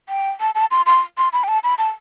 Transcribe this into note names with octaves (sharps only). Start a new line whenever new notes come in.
G5
A5
A5
C6
C6
C6
B5
G5
A5
B5
A5